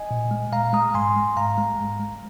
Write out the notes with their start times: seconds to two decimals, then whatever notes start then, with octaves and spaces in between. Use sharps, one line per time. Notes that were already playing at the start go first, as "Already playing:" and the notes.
Already playing: D#5 G#5
0.11 A#2
0.31 G#3
0.52 A#2 F5 A#5
0.73 G#3 A#5 D#6
0.94 G#2 G#5 C6
1.16 G#3
1.36 G#2 F5 A#5
1.58 G#3
1.80 G#2
2.00 G#3